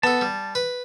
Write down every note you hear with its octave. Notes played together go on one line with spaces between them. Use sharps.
B3 A4 A5
G3
B4